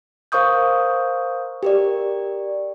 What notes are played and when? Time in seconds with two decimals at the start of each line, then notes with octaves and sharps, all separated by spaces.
0.32 A#4 C5 F5 C#6 D#6 G6
1.63 G4 A#4 D5